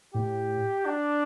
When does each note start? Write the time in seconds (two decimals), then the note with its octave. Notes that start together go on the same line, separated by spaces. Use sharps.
0.14 A2 G4
0.86 D4